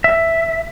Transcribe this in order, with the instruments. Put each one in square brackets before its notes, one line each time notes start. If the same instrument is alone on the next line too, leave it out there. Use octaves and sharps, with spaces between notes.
[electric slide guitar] E5